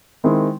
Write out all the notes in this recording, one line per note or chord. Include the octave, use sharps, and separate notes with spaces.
D#3 G#3 C4 E4